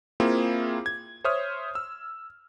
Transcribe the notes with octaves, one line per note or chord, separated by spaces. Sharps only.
A#3 C4 E4 F4 G#4
G#6
C5 C#5 E5 D#6 F6
E6